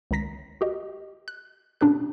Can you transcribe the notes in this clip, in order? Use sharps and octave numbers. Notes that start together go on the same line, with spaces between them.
C#2 D#3 A#5 A#6 B6
F#4 G4 D#5
F#6
B2 C#4 D4 G4 A4 F#6